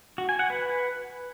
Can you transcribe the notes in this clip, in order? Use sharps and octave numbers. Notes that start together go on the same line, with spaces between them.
F#4
G#5
F#5
B4